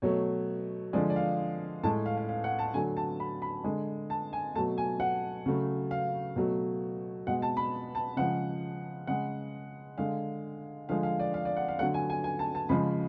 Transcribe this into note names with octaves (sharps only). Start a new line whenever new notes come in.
B2 F#3 A3 C#5
D3 F3 G#3 D5
D5
F5
A2 G#3 A5
F5
F5
F5
F#5
A5
D3 F#3 A3 G#5
A5
B5
B5
D3 G#3
A5
G#5
B2 F#3 A3 A5
G#5
F#5
C#3 F#3 A3
F5
B2 F#3 A3
B2 G#3 F#5
A5
B5
A5
C#3 F3 G#3 F#5
C#3 G#3 F#5
D3 G#3 F5
D3 F3 G#3 F5
F5
D5
F5
D5
F#5
F5
D3 F#3 A3 F#5
G#5
G#5
G#5
A5
A5
C#3 F3 G#3 B5